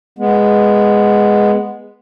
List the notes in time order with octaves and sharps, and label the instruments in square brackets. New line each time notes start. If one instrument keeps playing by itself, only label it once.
[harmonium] G#3 B3